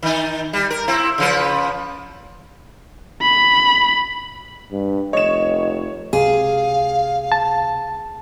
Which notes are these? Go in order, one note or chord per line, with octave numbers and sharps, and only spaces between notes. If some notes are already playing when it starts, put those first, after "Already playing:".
D#3 D#4
G3
A#4
C4 E4
C#3 F3 B4
B5
G2
F1 C#5 D#5 E7
C#2 C3 G#4 F5
A5